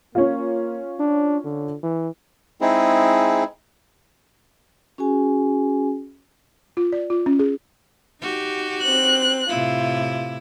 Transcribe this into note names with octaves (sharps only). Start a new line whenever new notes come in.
A#3 C#4 F4
D4
D3
E3
G#3 C4 D#4 E4 G#4
C#4 F#4 G#4 G#5
F4
D5
F4
C#4
G#4
D#4 F#4 G4
C4 F#6
A2 C3 E4 F4